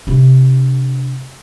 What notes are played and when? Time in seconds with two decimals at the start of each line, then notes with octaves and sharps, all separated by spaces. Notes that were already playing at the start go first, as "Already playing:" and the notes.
0.07 C3 D4